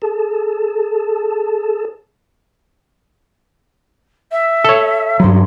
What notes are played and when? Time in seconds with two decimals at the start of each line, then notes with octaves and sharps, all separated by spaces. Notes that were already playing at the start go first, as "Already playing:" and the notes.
0.02 G#4 A4 A5
4.31 E5
4.64 A4 C#5
5.20 G2 F#3 C6